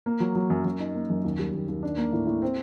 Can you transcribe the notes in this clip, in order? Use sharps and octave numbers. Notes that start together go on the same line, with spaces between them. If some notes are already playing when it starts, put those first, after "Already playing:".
A#3
F#3
F#3
F#2
F#2
D#4
A#3
F#2
D#2
G3
D#2
D#2
D4
A#3
A2
A2
C4